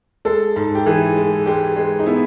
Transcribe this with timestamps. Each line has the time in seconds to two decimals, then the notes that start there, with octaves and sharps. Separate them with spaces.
0.25 G#3 A4
0.56 G#2
0.75 G4
0.86 E3 G#4
1.16 G#3
1.46 G#3 G4
1.77 G#3
1.99 D#4
2.07 B3 E4